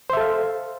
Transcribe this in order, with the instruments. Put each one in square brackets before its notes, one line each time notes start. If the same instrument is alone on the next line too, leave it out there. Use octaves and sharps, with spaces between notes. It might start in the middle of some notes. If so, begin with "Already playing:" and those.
[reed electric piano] C5
E5
A4
F5